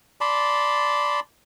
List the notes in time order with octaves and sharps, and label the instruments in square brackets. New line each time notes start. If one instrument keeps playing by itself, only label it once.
[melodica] D5 A5 B5 C6